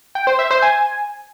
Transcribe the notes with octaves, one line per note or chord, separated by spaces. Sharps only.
G5
C5
E5
C5
G#5